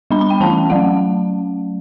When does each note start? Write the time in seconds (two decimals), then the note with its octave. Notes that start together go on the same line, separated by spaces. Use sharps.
0.11 G3 B3 D4 B5
0.21 B5
0.30 G5
0.40 E3 A3 C#4 A5
0.70 F#3 A3 C#4 F#5